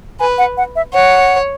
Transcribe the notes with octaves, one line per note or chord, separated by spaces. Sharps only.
B4 G#5
F#5
F#5
E5
C#5 F#5